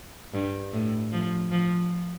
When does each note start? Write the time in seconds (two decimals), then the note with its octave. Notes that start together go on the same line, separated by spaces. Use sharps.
0.34 G2
0.73 A2
1.12 F3
1.51 F3